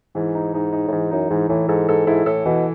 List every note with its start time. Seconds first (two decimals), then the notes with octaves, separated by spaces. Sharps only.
0.15 G#2 E3
0.35 D#4
0.54 G#2 D#4
0.72 D#4
0.88 A2
0.92 G#2 E3
1.11 F#2 D#4
1.30 G#2 E3
1.49 A2 E3
1.68 G#2 A4
1.89 G#2 A4
2.07 G#2 E4
2.26 A2 A4
2.46 B2 E3